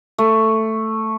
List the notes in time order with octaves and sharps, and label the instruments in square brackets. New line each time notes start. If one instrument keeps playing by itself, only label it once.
[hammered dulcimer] A3